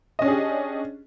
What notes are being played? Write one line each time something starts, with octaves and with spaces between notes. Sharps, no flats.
C#4 D4 G4 G#4 D#5